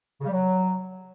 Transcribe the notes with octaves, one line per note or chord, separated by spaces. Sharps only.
C#3
G3
F#3